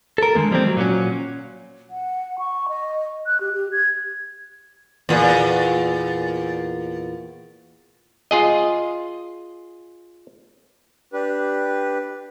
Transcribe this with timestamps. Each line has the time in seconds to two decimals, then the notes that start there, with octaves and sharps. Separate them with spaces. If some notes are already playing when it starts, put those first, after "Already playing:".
0.18 A4 A#4
0.35 D3 D#3 G#3 A#3
0.51 F3 G3 G#3 A#3 C4
0.64 F#3
0.77 A#2 F#3 C#4
1.90 F#5
2.39 C#6
2.69 D#5
3.26 F#6
3.41 G4
3.54 G4
3.72 G#6
5.09 E2 A#2
8.31 F4 G#4 D#5
11.13 D4 G4 B4